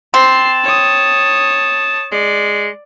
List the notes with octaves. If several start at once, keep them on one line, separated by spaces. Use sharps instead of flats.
C4 A5 C7
C#5 D#6
G#3 D5